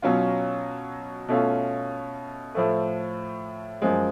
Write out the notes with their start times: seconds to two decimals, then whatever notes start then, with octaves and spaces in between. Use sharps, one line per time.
0.02 B2 F#3 C#4 F4
1.28 B2 A3 C#4 F4
2.55 A2 F3 A3
3.82 F#2 F3 G#3